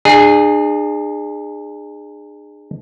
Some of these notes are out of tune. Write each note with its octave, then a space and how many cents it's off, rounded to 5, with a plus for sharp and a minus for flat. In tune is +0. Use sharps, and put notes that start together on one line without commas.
D4 +40 G#4 -10